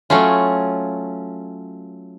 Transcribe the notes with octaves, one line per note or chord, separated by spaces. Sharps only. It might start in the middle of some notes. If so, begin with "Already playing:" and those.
F#3 A3 C#4 F4